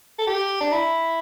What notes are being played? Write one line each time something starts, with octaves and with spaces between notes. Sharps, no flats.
A4
G4
D4
E4